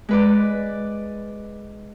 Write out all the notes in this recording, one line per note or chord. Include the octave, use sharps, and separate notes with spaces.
G#3 B4 D5